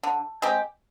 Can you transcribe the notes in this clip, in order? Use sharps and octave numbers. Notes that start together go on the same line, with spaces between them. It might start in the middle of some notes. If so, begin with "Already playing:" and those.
D3
G#3 C4 G4